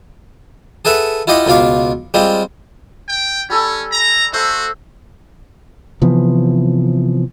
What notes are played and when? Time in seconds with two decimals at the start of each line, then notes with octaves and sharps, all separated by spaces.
0.85 G#4 A4 B4 E5 F#5
1.27 E4 F4 G4 D#5 F5 F#5
1.46 C#2 B2 F4 F5 D6
2.14 G3 G#3 C4 F4
3.08 G5
3.50 G3 C#4 A4 G#5
3.92 A#5
4.33 A3 F#4 C5 E5
6.02 C3 E3 F3 B3